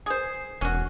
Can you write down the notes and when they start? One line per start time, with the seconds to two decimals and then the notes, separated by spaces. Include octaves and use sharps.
0.06 G#4 C5
0.61 E1 C#4 F#4